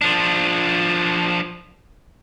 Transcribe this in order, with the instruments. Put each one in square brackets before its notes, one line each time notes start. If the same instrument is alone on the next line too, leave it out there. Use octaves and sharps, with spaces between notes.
[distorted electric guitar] F3 D4